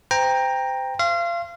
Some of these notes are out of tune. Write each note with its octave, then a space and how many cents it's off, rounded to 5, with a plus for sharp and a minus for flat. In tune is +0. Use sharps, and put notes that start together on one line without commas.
C5 -30 G5 +15 A#5 +0
F5 -30 C6 +25